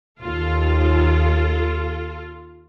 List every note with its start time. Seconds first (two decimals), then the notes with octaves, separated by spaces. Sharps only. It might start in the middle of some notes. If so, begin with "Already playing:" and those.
0.21 D#2 F4 A4